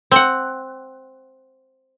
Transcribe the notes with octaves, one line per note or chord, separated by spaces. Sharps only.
C4 F#5